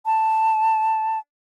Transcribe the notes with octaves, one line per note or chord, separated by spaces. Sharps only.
A5